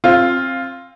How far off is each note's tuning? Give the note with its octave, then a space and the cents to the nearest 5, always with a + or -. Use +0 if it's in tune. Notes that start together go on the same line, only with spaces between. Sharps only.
C4 +20 F4 +0